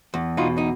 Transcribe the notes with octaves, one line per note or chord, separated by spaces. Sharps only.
E2
B2 D#4 F4
D#4